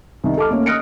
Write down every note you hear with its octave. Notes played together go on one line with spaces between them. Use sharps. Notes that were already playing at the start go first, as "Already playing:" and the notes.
C2 D#3
A4 A5 D6 F6
A3 A#3 C#4
D#6 F6 F#6 A#6 C#7 D7